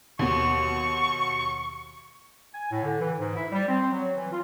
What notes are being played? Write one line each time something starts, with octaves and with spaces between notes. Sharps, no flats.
D#2 B2 C#6
G#5
A2
D3
E3
G#2
E4
G3
C4
F#3
E3
F4